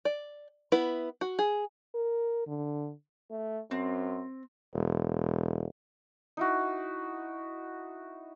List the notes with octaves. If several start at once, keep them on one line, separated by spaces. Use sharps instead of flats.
D5
B3 E4 B4
F#4
G#4
A#4
D3
A3
F#2 C4
E1
D#4 E4 F#4